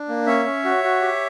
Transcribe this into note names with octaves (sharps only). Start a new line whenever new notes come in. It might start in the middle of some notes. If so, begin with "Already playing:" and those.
Already playing: D4
A#3
C#4 C#5 E5
C#4
F#4
F#4
G4